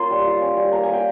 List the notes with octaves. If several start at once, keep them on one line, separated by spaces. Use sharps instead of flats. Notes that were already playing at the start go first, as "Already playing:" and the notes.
Already playing: A#3 C#4 F4 A#5 C6
G3
F4
C#4
G3
A#3 A#5
G#5
A#3 G5